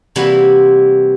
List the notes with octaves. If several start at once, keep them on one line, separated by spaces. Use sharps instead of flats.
C3 E3 G3 A#3 E4 F#4